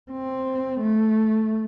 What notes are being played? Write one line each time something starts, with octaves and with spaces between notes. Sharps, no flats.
C4
A3